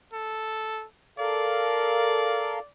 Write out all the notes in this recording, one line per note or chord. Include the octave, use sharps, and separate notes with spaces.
A4
A4 A#4 D5 F5